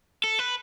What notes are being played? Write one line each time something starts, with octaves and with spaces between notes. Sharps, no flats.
A4
B4